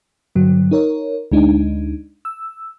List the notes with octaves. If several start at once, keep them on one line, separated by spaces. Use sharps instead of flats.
G2 D3 F#3
D#4 A#4 C#5
D2 G#3 D4 D#4
E6